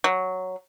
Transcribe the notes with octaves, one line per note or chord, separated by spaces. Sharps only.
F#3